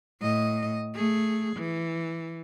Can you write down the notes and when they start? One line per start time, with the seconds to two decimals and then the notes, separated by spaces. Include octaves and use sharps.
0.21 A2 D#5
0.94 A3 G#4
1.56 E3